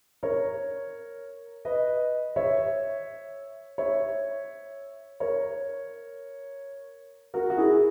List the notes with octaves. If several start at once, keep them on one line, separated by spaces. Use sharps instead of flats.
A#4 C#5
B4 D#5
C#5 E5
C#5 E5
A#4 C#5
F#4 A#4
F#4
E4 G#4